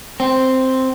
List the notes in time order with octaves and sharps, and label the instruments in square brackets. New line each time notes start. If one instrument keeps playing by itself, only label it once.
[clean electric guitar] C4